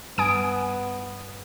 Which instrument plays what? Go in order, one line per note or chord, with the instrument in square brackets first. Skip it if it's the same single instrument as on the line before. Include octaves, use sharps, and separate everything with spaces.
[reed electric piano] G2 [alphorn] B3 [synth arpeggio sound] G#5 D#6 D7